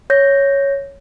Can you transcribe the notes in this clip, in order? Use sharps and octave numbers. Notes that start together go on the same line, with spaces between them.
C#5 G6 A#6